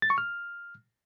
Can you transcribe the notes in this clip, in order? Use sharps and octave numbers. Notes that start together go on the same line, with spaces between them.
A6
C#6
F6